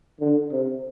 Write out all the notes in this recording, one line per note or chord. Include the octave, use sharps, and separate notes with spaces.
D3
C3